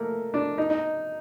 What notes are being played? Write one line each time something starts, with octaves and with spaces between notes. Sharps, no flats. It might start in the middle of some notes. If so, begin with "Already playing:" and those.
Already playing: A3 A#3
D4
D#4
D#4